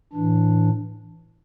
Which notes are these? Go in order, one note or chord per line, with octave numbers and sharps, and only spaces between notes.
A2 E3 D4